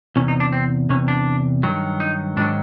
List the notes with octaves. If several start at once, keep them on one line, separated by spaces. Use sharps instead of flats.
E2 C3 C#4
D#4
D4
C4
E2 C3 C#4
D4
G2 D#3 F#3
D#4
G#2 D#3 F#3 D4